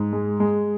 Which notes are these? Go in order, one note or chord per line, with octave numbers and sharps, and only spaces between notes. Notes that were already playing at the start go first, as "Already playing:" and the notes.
Already playing: G#2
G#3
G#3